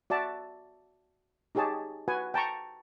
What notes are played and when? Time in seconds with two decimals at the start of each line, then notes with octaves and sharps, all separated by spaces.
0.10 F#4 D5 E5 A5
1.55 D#4 G4 G#4 C#5 A5
2.08 F#4 B4 F#5 G#5
2.34 G5 A5 A#5 C#6